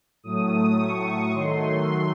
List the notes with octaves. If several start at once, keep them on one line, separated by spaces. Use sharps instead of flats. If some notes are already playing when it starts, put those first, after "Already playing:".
A2 F#3 A3 D#6
C#6
D#3 F#3 A3 C6